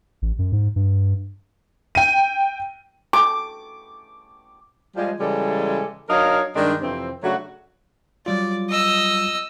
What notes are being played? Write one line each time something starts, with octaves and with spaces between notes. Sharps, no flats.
A1
F#2
G#2
G2
G5 D#7
D6
F3 G3 G#3
C#3 E3 G3 G#3 A4
F#3 D4 D#4 A#4 C#5 F5
G2 D#3 G#3 D4
F2 C3 E3 C4
C#3 F#3 A3 D4 F#4
F#3 G3 F4 D5
D#5 E6